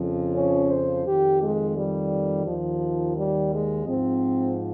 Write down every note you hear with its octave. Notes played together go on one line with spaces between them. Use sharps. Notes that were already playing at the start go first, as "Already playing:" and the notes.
Already playing: F2 C#3 F3
C#4
C5
F2 D#3 G4
G#3
G3
D#2 D#3 F3
G3
G#3
G#2 F3 C4